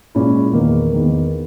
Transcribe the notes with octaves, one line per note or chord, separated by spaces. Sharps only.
A#2 G#3 C#4 E4
E2 D#3 A#3
E2 D#3 A#3